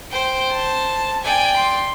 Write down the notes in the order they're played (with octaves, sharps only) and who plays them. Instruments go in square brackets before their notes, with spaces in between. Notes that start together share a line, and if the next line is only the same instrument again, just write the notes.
[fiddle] C5 [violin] G5
[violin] A5
[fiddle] D5 G5 [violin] G#5
[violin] C6